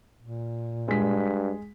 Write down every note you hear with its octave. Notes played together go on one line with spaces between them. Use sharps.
A#2
G2 G#3 B6